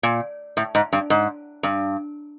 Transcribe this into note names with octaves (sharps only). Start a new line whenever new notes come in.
A#2
A2
G#2
G2
G#2
G2